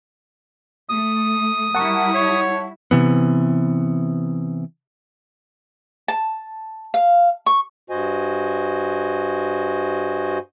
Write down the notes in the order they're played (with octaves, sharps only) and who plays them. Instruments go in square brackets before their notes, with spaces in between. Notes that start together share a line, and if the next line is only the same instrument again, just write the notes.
[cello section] A3 [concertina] D#6
[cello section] G3 E4 [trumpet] A#4 [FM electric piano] F#5 A5 C#6
[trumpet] C#5
[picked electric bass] C3 E3 B3
[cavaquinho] A5
F5
C#6
[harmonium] G2 F#4 C5 D#5 G#5